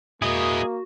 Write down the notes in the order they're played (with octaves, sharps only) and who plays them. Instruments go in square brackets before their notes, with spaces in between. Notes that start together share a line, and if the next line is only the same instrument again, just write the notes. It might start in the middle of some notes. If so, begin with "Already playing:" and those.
[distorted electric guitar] G#3 E4 [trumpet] A#3 [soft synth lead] F#4 [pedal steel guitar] G#4 D#5